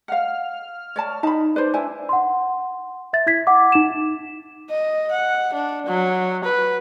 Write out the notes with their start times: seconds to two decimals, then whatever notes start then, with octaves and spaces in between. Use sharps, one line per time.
0.08 F5 F#5 F6
0.96 C#5 D5 A5
1.23 D#4 A5 B5
1.56 B4 C5 D5
1.74 D4 E4 G#5
2.09 F#5 C6
3.13 E5 A6
3.27 E4 G#6 B6
3.47 F#5 D6
3.72 D#4 E7
4.69 D#5
5.11 F#5
5.54 D4
5.86 F#3
6.44 B4